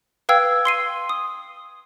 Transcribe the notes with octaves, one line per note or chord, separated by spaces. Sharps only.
B4 F5 G5 E6 G#6
C6 C7 D#7
D#6